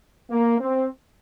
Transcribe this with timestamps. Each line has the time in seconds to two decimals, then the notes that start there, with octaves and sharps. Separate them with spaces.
0.30 A#3
0.59 C4